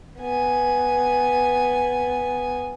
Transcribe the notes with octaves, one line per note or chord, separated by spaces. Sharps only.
B3 G#5